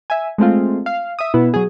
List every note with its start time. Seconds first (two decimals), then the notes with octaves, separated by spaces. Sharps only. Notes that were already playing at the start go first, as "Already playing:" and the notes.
0.10 E5 G#5
0.38 G#3 A3 C4 F4
0.86 F5
1.19 E5 D#6
1.34 B2 B3 E4
1.54 F#3 G#4